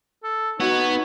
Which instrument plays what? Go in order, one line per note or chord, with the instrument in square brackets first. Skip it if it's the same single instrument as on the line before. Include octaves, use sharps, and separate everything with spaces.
[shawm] A4
[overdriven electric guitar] B3 [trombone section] D#4 [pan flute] F#4 [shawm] C#5